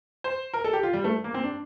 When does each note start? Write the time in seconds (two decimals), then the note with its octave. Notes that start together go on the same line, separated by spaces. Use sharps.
0.24 C5
0.53 A#4
0.64 A4
0.73 G4
0.83 F4
0.93 G3
1.04 A3
1.24 A#3
1.34 C4
1.44 D4